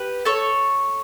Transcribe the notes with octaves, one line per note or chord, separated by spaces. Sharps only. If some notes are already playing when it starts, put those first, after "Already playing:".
Already playing: G4 B4
A4 C#5